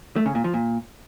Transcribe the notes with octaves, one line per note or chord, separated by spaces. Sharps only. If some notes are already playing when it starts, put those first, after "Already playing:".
A3
C#3
A#2
F3
A#2